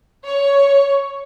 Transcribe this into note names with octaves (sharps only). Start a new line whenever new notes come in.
C#5